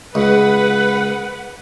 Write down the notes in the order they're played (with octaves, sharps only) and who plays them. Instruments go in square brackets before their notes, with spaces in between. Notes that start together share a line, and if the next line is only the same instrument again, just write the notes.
[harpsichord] C#2 [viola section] B4 F#5